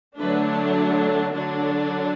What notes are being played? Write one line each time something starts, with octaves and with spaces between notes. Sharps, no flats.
D3 F#3 A3 D4 B4
D3 F#3 D4